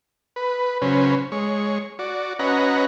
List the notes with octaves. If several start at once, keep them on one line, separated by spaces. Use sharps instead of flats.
B4
C#3 F#3 C#4 B4 C5
G#3 C#5
F#4 D5
C#4 F#4 B4 D#5 F#5 A#5